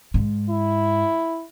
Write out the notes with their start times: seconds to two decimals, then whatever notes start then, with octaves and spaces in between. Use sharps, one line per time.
0.14 G#2
0.49 E4